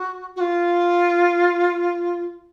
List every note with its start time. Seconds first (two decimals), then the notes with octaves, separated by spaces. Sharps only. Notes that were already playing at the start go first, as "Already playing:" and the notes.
Already playing: F#4
0.36 F#4
0.40 F4